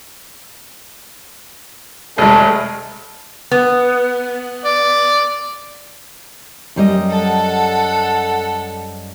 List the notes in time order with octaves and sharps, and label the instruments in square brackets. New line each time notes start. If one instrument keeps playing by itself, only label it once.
[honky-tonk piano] F1 G#3 [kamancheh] A3
[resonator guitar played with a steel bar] B3
[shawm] D5
[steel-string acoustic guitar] F#2 G3 D#5
[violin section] A4 F#5